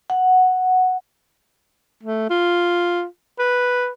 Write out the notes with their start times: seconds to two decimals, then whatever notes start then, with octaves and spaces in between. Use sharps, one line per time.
0.10 F#5
2.03 A3
2.30 F4
3.39 B4